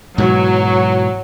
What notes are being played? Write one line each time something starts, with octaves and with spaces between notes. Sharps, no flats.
G#2 B2 E3 F#3